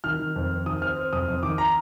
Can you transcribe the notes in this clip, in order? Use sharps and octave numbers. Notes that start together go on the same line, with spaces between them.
D#3 F6
D#3
F2
C4
D#3 D#6
C4 F6
C4
F2 D#6
F2
D#3 D6
A#5